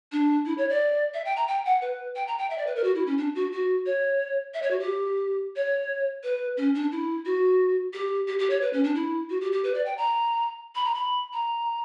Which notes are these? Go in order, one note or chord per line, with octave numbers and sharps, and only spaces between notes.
D4
E4
C#5
D5
E5
G5
A#5
G5
F#5
B4
G5
A#5
G5
E5
D5
B4
A#4
F#4
E4
C#4
D4
F#4
F#4
C#5
E5
C#5
F#4
G4
C#5
B4
C#4
D4
E4
F#4
G4
G4
G4
C#5
B4
C#4
D4
E4
F#4
G4
G4
B4
D5
G5
A#5
B5
A#5
B5
A#5